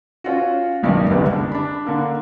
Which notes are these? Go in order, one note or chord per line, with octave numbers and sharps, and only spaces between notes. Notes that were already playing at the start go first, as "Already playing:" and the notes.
C#4 F4 F#4
F#1 B1 G2 D#3 D5
F#1 C2 D3 G3 G#3 B3
D4
D4 B5
D3 A#3